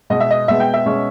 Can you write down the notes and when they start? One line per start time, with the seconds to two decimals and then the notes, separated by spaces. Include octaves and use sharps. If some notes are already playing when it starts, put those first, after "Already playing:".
0.10 B2 G#3 B3 D#5
0.20 E5
0.31 D#5
0.48 B2 G#3 B3 E5
0.60 G5
0.74 E5
0.86 B2 G#3 C#4